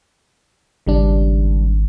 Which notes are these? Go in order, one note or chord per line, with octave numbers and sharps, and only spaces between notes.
G#1 C#3 G3 D4